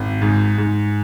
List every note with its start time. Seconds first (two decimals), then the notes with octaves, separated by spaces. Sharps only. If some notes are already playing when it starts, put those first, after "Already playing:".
Already playing: G#1
0.22 G#2
0.58 G#2